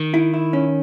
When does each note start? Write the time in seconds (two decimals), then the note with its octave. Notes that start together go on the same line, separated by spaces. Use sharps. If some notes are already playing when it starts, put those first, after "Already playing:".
Already playing: D#3
0.14 E4
0.34 E4
0.53 C#4